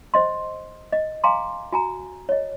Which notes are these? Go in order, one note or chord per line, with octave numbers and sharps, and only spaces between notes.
C5 D#5 C6
D#5
F5 G#5 A#5 C6 D6
F#4 G#5 A#5
C#5 D#5